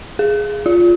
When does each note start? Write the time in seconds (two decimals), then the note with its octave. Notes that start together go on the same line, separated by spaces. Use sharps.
0.19 G#4
0.66 F4